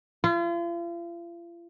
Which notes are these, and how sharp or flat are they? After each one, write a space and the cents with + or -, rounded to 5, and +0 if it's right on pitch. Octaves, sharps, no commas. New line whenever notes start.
F4 -40